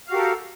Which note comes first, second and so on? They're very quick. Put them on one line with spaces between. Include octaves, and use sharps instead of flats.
F5 F#4 G4 A#4 A4